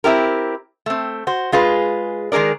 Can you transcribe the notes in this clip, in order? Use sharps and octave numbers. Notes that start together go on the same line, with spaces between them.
C4 E4 G4 A#4
A3 C4
F#4 C5
G#3 F4 G#4 B4
D#3 G#3 G#4 A#4 D5